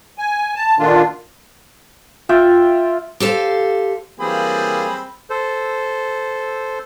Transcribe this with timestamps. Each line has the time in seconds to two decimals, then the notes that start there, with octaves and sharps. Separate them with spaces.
0.18 G#5
0.56 A5
0.79 A#2 D3 D#3 D4 F4
2.29 F4 E5 G5
3.20 G4 A4 C5 F5
4.20 E3 F#3 G3 A#3 C4 G#4 B5
5.30 A4 C5